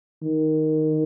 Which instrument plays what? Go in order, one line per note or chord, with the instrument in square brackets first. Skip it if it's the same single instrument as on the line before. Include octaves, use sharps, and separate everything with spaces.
[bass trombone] D#3